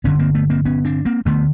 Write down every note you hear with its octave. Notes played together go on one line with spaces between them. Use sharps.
G1 F2 D3 B3 C#4
A#3 C4
A3 B3
A#3 C4
B3 C#4
C4 D4
A#3 C4
D2 D3 A3 B3